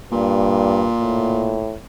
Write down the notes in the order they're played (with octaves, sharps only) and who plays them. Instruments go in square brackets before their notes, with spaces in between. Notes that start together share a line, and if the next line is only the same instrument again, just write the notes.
[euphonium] G2 [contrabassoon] A#2
[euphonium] A2